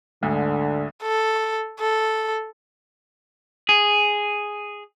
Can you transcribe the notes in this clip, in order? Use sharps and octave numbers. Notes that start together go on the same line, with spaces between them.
D2 G#2 D3
A4
A4
G#4